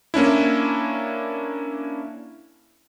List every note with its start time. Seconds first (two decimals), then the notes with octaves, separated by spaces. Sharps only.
0.14 A#3 C#4 D4 E4